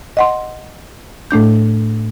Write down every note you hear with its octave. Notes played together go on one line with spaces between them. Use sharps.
D#5 F#5 C6
A2 A3 D4 G6